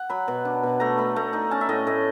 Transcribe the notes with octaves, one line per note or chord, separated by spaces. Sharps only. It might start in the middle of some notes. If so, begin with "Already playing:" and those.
Already playing: F#5
F#3 B5
B2
D4
B2
A3 A#5
A3 B5
A3 A#5
D#4 A#5
C#4 A5
E5
A2 D#5
A2 D#5